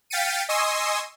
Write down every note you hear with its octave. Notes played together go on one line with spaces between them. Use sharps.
F5 G5 A6 B6 C#7 D#7
D#5 G#5 C6 C#6 D#6 E6